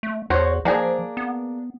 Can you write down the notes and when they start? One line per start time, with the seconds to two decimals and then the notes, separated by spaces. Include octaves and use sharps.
0.03 A3
0.30 E2 F#4 C5 C#5
0.65 F3 A#3 D4 G#4
1.17 B3